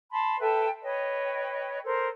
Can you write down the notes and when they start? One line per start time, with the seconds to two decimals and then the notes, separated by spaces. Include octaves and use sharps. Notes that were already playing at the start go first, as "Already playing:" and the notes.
0.10 A5 B5 C6
0.39 A4 B4 E5 G5
0.83 B4 C#5 D#5 G5
1.84 A4 A#4 C5